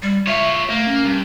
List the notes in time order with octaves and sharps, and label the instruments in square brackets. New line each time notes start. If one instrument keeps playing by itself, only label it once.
[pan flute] G3
[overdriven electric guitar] F4 C#5 [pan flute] E5
[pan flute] A3 [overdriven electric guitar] A#3
[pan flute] C#4
[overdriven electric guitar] G2